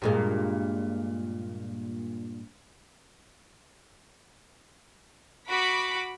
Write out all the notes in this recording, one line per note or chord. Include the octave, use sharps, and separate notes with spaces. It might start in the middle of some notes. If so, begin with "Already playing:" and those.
G2 A#2 G#3
F#4 F#5 B5 D6